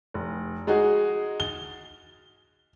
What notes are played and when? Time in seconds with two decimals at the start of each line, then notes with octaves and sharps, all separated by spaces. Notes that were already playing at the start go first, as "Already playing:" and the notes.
0.14 F1
0.67 G#3 D#4 F#4 G#4
1.40 G7